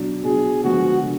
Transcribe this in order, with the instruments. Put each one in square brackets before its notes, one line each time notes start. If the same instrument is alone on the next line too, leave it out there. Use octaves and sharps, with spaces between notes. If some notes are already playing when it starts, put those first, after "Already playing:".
Already playing: [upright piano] B2 F#3 D4
[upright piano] B2 F#3 D4 [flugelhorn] G#4
[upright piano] D3 F3 G#3 B3 [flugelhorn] F#4
[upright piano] D3